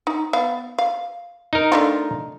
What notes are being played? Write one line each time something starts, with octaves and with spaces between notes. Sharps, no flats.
D#4
B3 F5
F5
D#4 A#4
A3 D4 F4